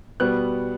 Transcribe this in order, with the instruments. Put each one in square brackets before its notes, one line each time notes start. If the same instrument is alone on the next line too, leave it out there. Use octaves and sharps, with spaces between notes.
[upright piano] B2 G3 B3 F#6